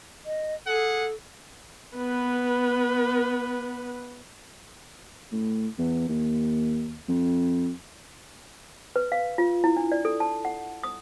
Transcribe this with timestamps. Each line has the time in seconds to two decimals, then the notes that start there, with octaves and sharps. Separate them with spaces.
0.26 D#5
0.66 G#4 A4 F#5
1.97 B3 B4
5.32 A2
5.78 E2
6.08 D#2
7.08 F2
8.96 B4
9.12 F5
9.38 F4
9.64 E4
9.77 D4
9.92 D5
10.05 A4
10.20 A5
10.45 F#5
10.84 D#6